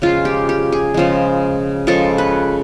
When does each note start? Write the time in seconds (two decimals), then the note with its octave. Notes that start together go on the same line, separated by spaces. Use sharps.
0.02 C#3 F3 G#3 F4
0.25 G4
0.49 G4
0.72 G#4
0.94 C#3 F3 G#3
1.87 C#3 F3 G#3 A4
2.18 B4